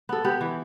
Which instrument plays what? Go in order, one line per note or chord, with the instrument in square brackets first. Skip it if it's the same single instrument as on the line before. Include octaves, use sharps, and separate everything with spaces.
[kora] B3 [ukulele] A4
[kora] B3 [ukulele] G4
[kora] E3